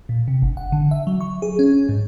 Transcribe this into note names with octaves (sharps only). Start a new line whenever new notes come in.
A#2
C3
G1
F#5
D3
E5
F#3
C#6
G#4
C#4
G#2